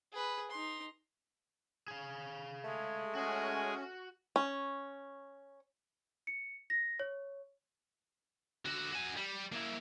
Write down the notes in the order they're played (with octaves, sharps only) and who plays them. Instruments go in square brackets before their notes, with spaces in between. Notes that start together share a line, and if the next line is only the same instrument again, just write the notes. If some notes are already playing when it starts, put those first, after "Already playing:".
[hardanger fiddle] G#4 B4
D#4 C6
[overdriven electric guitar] G#4 F5
[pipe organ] G#3 [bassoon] A3
[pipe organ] G#3 G#4 G#5 [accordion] C#4 [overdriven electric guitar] F#4
[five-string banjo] C#4
[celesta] C#7
A#6
C#5
[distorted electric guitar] D3 F#4
F#4 G#5
G3
A#3 E4